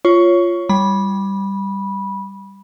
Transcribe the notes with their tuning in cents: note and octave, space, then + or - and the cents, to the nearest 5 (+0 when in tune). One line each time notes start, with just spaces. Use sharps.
F4 -5 C#5 +0 C#6 +15
G3 +0 B5 -15